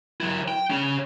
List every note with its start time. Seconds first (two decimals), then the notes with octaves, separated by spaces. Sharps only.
0.21 F#3 E4
0.48 G5
0.70 C#4 G#4